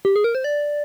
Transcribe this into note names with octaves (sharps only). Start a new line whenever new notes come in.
G4
G#4
A#4
C5
D5